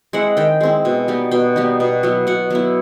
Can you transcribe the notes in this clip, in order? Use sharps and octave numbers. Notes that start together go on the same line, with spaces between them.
G#3 C4 E4 F#5
D#3 G5
G#3 C4 E4
B2
G3 B3 D#4
B2 G5
G3 B3 D#4
B2
F#3 B3 E4
B2 F#5
F#3 B3 E4